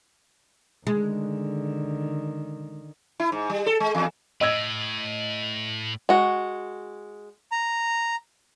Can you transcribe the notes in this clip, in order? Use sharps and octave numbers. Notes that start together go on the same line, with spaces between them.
D3 D#3 G#3
E4
G#2
G3
A4
G#3
E2
A2 D#5 E6 G#6
G#3 F#4
A#5